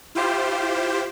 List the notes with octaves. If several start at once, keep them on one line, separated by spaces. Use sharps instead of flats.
E4 F4 G4 C5